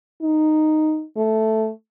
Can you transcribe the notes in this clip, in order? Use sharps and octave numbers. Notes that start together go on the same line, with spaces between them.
D#4
A3